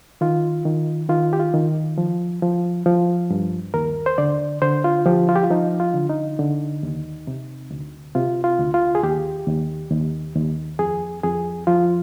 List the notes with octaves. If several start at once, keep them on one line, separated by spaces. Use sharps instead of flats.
D#3 F4
D#3
D#3 F4
G4
F4
D#3
F3
F3
F3
G2
D#2 A#4
C5
D3 D5
D3 C5
F4
F3 G4
F4
G4
F4
F3 D#4
F4
D3
D#4
D3
D#2
C3
D2
C3 F4
F4
D2
F4
G#4
D#2 G4
D#2
D#2
D#2
F2 G#4
F2 G#4
F3 F4